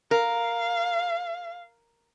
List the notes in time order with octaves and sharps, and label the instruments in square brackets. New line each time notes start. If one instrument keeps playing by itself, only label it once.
[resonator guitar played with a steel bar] A#4 [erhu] F5